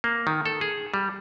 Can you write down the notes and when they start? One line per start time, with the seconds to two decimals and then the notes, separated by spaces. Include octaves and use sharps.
0.04 A#3
0.27 D#3
0.46 A4
0.61 G#4
0.94 G3